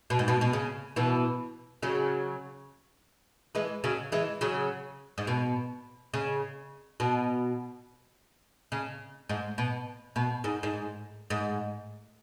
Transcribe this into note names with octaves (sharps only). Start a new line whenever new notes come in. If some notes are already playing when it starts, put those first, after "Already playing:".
B2
G#2
B2
B2
C#3
B2 E3
C#3 F#3
E3 G#3
C#3 F#3
E3 G#3
C#3 F#3
G#2
B2
C#3
B2
C#3
G#2
B2
B2
G#2
G#2
G#2